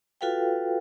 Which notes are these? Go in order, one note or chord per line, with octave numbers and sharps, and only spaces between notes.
F4 F#4 A4 B4 F5 G5